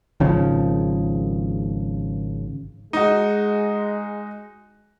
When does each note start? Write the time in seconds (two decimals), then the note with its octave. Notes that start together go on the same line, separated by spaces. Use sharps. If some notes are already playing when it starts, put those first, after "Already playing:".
0.20 G#1 C#3 F3
2.93 G#3 D#4 F#4